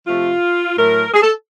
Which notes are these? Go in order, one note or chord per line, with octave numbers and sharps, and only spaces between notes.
C3 F3 A3 F4
A2 F#3 A3 A#4
G#4
A4